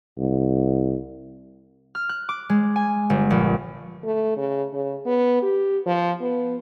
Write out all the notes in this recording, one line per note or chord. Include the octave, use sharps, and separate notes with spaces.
C2
F6
F#6
D6
G#3
G#5
G1
A#1
A3
C#3
C#3
B3
G4
F3
B3